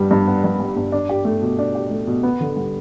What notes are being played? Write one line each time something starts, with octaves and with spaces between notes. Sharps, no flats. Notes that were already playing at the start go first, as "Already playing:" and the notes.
Already playing: G2 G3 B3
G2
B3
G2
G3
G2
D4
G4
A3
B2
D4
G4
A3
B2
B3
D3
G3